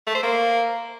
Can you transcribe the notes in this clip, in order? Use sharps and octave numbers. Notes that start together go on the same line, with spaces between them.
A3
C5
A#3